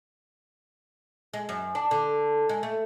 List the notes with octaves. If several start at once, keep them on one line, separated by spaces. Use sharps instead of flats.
G#3
F#2
D4
D3
G#3
A3